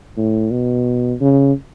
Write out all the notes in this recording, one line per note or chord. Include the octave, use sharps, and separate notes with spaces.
A2
B2
C#3